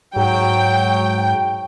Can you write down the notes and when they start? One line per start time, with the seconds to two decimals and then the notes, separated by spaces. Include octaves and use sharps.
0.16 G#2 F#3 G5